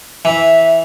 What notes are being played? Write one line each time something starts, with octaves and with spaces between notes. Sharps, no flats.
E3 E5